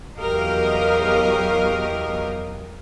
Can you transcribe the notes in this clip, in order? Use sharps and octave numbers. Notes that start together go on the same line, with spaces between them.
E2 F#3 G4 A#4 D#5 F5